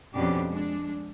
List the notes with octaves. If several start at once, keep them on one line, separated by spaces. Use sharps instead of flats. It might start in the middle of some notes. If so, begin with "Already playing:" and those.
F2 B2 C#4 D4 G4
G#3 D4